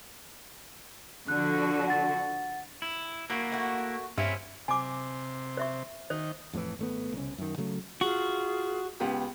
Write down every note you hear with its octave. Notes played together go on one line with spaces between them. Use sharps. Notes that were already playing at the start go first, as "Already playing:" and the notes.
D3 F3 F#4 F#6
F#5 A6
E4
A#3 E4 F#4
A3 F#4
G2 C4 C#4 E4 E5 F5
C3 G#5 D6
C5 E5 C#6
D#3 C5
F2 A2 C3 E3
G#1 A3 B3
C2 C#3
F#2 D#3
C#3 F#3 A3
F4 F#4 G#4
C#2 B3 G4